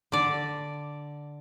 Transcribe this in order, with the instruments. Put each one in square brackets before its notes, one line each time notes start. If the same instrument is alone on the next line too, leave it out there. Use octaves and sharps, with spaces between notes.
[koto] D3 D5